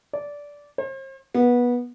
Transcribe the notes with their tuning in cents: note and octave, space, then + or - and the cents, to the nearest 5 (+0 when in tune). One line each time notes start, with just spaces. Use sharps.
D5 -15
C5 +40
B3 -20